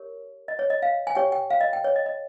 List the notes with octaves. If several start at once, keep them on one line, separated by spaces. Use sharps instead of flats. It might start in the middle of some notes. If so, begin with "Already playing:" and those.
Already playing: G4 A#4 C#5
D#5
C#5
D#5
F5
G#5
G4 C#5 G5
G5
F5
D#5
G5
C#5
D#5
D#5